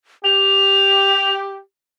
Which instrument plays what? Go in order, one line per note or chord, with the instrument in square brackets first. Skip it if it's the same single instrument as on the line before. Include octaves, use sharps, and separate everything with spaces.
[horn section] G4 [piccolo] F7